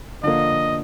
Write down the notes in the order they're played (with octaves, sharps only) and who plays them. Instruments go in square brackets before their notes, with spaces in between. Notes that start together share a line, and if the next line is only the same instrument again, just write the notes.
[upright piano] D3 F3 A#3 [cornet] D#5